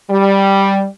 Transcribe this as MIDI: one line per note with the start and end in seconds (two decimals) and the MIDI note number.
0.10 0.85 55